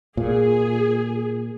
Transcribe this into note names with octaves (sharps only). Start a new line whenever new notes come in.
A#2 G#4